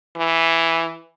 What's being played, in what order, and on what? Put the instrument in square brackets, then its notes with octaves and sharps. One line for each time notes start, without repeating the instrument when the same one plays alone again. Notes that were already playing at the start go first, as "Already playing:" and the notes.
[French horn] E3